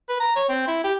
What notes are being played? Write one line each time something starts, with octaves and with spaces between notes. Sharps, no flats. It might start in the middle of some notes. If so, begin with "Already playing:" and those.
B4
A#5
C#5
C4
E4
G4